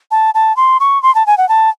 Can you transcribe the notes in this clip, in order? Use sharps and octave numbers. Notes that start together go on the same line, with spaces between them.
A5
A5
C6
C#6
C6
A5
G#5
F#5
A5